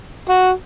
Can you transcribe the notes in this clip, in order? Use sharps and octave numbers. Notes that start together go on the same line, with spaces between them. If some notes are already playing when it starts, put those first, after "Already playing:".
F#4